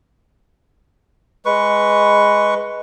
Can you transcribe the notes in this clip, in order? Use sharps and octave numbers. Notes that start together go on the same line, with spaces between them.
G#3 B4 C#6